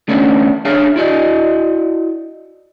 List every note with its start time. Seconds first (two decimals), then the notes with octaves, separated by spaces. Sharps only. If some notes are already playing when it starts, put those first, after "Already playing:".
0.08 D3 A3 B3 C#4 D4
0.65 D4 G#4 C#5 E5 F5
0.96 E4 F#4 D5 D#5